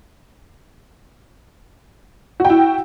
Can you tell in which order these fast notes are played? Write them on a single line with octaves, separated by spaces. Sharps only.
F#4 G5 E4